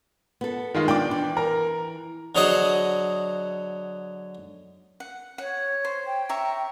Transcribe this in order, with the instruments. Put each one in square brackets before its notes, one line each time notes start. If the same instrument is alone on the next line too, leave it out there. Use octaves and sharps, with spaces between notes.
[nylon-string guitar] B3 A4
[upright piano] D#3 G#3 F4
[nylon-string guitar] B3 D4 [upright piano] G5 D6
[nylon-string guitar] E3
[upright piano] A#4 A#5
[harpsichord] D3 F#3 G#4 C5 D#5 F#5
[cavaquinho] F#5
[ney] C#5 [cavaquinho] F#5
[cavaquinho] C5
[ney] G5
[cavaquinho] C#5 E5 A#5